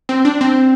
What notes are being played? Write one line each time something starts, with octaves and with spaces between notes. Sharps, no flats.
C4
D4
C4